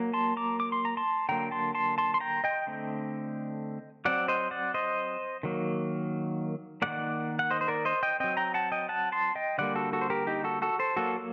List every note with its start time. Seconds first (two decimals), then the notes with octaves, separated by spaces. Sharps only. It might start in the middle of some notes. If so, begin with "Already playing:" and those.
Already playing: F#3 A#3
0.13 A5 C6
0.37 A#5 D6
0.60 D6
0.72 C6
0.85 A#5
0.97 A5 C6
1.29 D3 F#3 A#3 G5 A#5
1.51 A5 C6
1.75 A5 C6
1.98 A5 C6
2.14 C6
2.20 G5 A#5
2.44 D#5 G5
2.67 D3 A3 C4
4.05 F#3 C4 D5 F#5
4.28 C5 D#5
4.51 D5 F#5
4.74 C5 D#5
5.43 D#3 F#3 A#3
6.82 D#3 G3 A#3 D5 F#5
7.39 F#5
7.51 C5 D#5
7.61 C5
7.68 A#4 D5
7.85 C5 D#5
8.03 D#5 G5
8.20 F#3 C4 D#5 G5
8.37 G5 A#5
8.54 F#5 A5
8.72 D#5 G5
8.89 F#5 A5
9.12 A5 C6
9.35 D#5 G5
9.58 D3 G3 A#3 D5 F#5
9.75 F#4 A4
9.93 F#4 A4
10.01 C5
10.10 G4 A#4
10.27 D#4 G4
10.44 F#4 A4
10.62 F#4 A4
10.79 A4 C5
10.97 F#3 A#3 F#4 A4